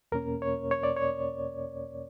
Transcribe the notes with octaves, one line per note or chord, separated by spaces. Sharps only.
E2 B2 A#3 C#4 A#4
C#5
C#5
D5
C#5